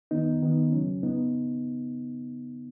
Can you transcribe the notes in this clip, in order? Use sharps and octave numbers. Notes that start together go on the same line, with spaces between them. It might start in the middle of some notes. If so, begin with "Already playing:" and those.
D#3 B3 D#4
D#3 B3 D#4
C#3 F#3 C#4
C#3 B3 D#4